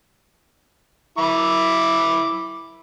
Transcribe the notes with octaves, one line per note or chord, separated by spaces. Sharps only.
E4 B5 D6